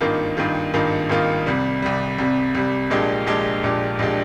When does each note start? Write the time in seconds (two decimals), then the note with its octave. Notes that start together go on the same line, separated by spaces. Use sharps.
0.01 G#1 G2 D#3 A#3 F4
0.37 G#1 G2 D#3 A#3 F4
0.74 G#1 G2 D#3 A#3 F4
1.09 G#1 G2 D#3 A#3 F4
1.47 C2 C3 G3
1.82 C2 C3 G3
2.18 C2 C3 G3
2.55 C2 C3 G3
2.90 A#1 A#2 G#3 D4 G4
3.26 A#1 A#2 G#3 D4 G4
3.63 A#1 A#2 G#3 D4 G4
3.99 A#1 A#2 G#3 D4 G4